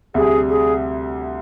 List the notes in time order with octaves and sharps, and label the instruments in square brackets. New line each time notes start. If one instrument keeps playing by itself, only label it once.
[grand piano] D2 C3 G3 [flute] G#4
[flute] G#4